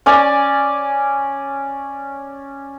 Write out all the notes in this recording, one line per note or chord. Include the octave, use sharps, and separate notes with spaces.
C#4 D5 G#5